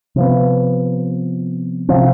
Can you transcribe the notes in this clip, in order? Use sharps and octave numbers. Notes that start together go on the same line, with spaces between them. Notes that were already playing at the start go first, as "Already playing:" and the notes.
C3 F3 B3
C3 F3 C4